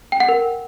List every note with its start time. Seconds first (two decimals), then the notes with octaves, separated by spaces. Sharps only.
0.12 G5
0.20 F#5
0.29 A#4